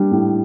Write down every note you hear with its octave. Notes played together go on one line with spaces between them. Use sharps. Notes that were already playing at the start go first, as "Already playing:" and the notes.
Already playing: G3 D4
A2